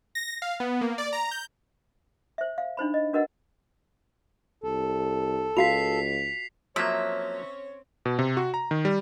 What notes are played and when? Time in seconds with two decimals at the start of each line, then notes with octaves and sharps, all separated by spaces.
0.15 A#6
0.42 F5
0.60 B3
0.81 A#3
0.98 D5
1.13 A#5
1.31 G6
2.38 C5 E5
2.58 F5
2.77 D4 D#4 C5 B5
2.94 D#5
3.13 D4 F#4 A#4 B4 D#5 F#5
4.64 C2 A4
5.57 C#2 F4 F#4 F5 B6 C7 F7
6.76 F3 F#3 A#3 C4 C#4 C#5 E5
8.05 B2
8.19 C3
8.37 F#4
8.54 A#5
8.71 D#3
8.85 G3